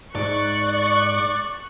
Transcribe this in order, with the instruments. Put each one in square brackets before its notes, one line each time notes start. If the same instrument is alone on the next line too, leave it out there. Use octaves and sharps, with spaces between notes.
[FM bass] G#2 [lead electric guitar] D5 [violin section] C#6 F#6